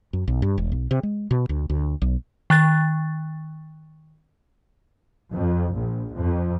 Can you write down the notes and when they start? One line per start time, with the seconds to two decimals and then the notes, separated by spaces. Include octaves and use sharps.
0.13 F#2
0.28 B1
0.42 G2
0.58 E1
0.72 B1
0.91 C3
1.03 G#3
1.31 B2
1.49 D2
1.70 D2
2.02 B1
2.50 D#3 F#6 A6
5.34 F2
5.74 A#1
6.17 F2